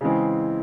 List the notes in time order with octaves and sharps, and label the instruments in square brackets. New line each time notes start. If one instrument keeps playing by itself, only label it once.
[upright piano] C#3 E3 G#3 C4